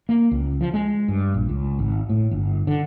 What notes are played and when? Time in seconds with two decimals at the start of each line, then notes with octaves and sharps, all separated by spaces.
0.09 A#3
0.31 C#2
0.61 F3
0.74 G#3
1.08 G2
1.34 A#1
1.49 C#2
1.79 G#1
2.09 A2
2.31 G1
2.67 D3